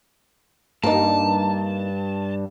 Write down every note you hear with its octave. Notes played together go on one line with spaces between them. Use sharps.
G2 A#3 D#4 A5